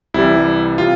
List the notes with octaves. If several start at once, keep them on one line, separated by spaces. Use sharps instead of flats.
C2 C3 E3 G3 E4
C3 F4